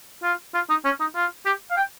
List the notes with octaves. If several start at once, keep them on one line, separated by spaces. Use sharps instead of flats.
F4
F4
D#4
C#4
D#4
F4
G4
F5
G5